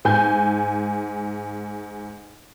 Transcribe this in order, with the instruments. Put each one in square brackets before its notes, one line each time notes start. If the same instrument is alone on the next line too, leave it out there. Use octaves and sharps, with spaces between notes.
[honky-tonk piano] G#2 G#5 G6